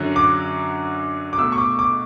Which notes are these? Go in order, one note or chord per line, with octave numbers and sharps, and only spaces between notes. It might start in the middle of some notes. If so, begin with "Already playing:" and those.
Already playing: F#2 D3 F#3
D6
D6
B2 A3 E6
C#6
D6
D6